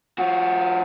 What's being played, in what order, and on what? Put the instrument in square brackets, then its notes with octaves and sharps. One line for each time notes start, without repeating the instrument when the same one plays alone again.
[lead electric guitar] F3 F#4